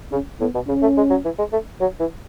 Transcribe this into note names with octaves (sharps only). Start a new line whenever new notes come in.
C#3 C#4
A2 B3
B2
C#3 C#4
A3
G#3
F#3
E3
G#3
A3
F#3
E3